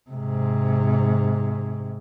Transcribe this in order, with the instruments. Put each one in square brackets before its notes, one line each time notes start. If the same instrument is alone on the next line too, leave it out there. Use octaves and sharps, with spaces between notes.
[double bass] G#2 C3